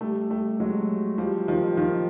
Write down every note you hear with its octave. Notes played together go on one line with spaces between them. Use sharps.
G3 A3
G3 A3
F#3 G#3
F3 G3
D#3 F3
D#3 F3